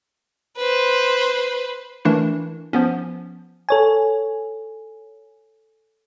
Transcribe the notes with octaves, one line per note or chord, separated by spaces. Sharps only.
B4 C5
E3 A3 D4 E4 A#4
F3 B3 C#4
A4 C#5 G#5